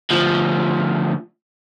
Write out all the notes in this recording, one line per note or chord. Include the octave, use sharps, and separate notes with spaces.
D2 F3